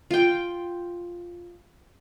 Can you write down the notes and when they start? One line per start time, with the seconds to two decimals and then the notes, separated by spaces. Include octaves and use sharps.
0.11 F4 G5